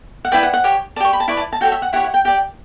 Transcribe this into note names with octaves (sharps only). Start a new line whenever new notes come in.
F#5
E4 B4 D5 G5
F#5
F#5
G4 C#5
D5 A5
G4 C#6
B5
A5
E4 B4 D5 C#6
A5
A5
F#4 A4 C#5 G5
E5
F#5
E4 G4 C#5 F#5
F#5
G5
G4 D5 G5